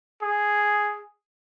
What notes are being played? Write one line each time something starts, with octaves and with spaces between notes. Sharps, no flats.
G#4